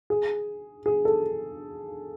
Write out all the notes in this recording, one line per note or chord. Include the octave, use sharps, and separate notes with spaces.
G#4
G#4
A4